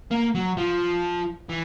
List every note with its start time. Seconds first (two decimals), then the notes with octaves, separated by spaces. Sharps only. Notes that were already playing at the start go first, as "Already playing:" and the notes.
0.11 A#3
0.35 F#3
0.57 F3
1.49 E3